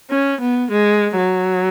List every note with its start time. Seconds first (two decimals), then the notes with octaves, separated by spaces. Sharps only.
0.10 C#4
0.41 B3
0.72 G#3
1.17 F#3